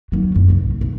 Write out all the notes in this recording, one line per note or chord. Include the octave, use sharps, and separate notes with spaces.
D#2 F#3
E1 F#2
C2 G#2
B1